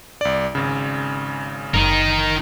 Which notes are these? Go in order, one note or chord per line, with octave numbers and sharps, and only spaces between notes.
C2 D5
G#1 C#3
F#1 D#4 A#4